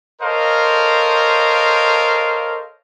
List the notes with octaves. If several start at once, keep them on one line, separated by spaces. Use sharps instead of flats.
A4 A#4 C5 C#5 D#5 F5